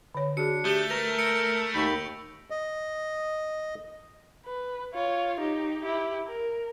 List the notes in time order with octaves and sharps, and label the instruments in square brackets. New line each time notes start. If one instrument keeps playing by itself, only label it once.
[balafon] D3 C#5
[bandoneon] D4 [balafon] F#4 G#4 [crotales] C#7
[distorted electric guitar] A3 [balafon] G4 [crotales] G6 G7
[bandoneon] A#4 [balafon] B4 [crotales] A#6 F7
[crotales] E6 C#7 D7
[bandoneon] D#2 D#3 B5 [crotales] C#6 G6
[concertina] D#5
[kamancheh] B4
F4 C#5
D#4 G4
E4 G4
A#4